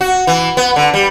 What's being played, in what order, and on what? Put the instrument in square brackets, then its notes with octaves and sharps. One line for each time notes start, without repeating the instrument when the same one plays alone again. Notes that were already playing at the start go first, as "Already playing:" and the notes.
[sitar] F#4
E3
B3
D3
G3